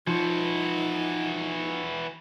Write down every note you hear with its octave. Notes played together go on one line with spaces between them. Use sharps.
E3 F3 D#4 F#4